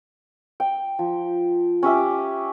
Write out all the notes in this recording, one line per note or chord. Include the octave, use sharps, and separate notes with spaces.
G5
F3
C#4 G4 E5 D6